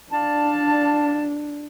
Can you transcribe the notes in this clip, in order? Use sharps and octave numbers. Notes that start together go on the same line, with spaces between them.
D4 D5 F5 A5